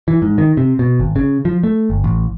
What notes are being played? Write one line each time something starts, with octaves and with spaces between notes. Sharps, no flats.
E3
G#2
D#3
C3
B2
G#1
C#3
F3
A3
G1
A1